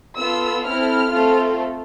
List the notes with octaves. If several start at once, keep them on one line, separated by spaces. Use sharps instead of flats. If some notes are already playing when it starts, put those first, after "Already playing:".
B3 F4 A4 E6
C4 E4 A4 F6
A3 C4 F4 A4